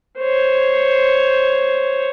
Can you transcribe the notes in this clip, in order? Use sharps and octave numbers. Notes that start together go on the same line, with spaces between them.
C5 C#5